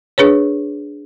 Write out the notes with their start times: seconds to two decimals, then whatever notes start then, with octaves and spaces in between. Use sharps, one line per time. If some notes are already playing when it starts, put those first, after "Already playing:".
0.18 D4 G#4 B4 C#5